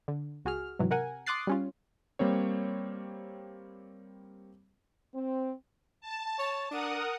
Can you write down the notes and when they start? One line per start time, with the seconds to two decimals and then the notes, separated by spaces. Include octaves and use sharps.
0.08 D3
0.45 C#2 F#4 G#4 F6
0.79 G#2 C3 E3 F#3
0.91 C3 A#4 F#5 G#5
1.26 C6 D6 D#6 F#6 A6 C7
1.47 G3 C#4 F4
2.19 G3 A#3 C4 C#5
5.15 C4
6.01 A5
6.39 C#5
6.71 D4 A#4 F#5 D#6